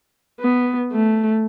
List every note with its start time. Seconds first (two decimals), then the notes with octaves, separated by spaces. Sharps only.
0.40 B3
0.92 A3